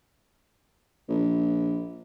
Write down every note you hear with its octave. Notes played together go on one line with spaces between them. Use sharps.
A#1